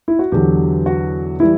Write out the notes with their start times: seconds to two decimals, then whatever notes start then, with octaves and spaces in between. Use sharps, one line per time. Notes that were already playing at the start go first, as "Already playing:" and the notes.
0.08 E4
0.19 F#4
0.32 E2 D3 F#3 G4
0.86 F#4
1.40 E3 G3 E4